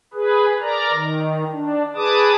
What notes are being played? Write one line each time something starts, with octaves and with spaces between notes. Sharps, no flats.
G#4 B4
A#4 D5 A#5
D#3
D4
G#4 B4 A5 D6 D#6